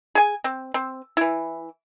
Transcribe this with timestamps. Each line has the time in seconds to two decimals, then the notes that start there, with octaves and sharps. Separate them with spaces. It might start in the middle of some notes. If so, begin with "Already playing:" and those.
0.15 G#4 G#5
0.44 C4
0.74 C4
1.17 E3 E4